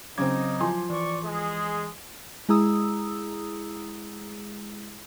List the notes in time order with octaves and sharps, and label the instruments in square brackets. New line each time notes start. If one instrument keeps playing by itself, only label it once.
[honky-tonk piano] C#3 C4 [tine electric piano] F#3 D6 G#6 [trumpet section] D#4
[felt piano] F3 G#5 [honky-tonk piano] C6
[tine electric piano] E3 [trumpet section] D5 C#6
[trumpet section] G#3 G#4
[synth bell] G#3 E4 G#4 A#5 D#6 E6